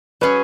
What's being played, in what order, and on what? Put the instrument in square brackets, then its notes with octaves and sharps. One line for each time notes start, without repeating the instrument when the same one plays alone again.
[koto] F#3 C#4 G#4 [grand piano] B4